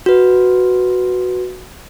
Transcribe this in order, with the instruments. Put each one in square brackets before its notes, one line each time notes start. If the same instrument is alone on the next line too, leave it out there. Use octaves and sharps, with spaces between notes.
[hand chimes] F#4 B4